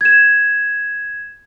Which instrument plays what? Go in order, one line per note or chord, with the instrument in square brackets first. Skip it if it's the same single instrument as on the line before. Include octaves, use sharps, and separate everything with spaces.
[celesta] G#6 E7